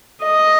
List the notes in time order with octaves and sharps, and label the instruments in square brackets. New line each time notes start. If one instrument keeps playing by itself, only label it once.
[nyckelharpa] D#5